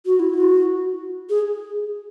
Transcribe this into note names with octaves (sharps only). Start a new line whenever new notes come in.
F#4
E4
F#4
G#4